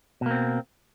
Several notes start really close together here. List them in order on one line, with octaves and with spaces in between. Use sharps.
B2 A#3 C4